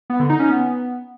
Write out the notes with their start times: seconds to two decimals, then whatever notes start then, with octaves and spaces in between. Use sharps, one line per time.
0.10 B3
0.20 D3
0.29 D#4
0.39 C#4
0.49 B3